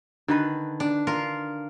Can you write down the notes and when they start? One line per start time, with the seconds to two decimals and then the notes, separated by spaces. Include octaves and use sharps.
0.28 D3 D#3 B4
0.80 D4
1.07 F4 A#4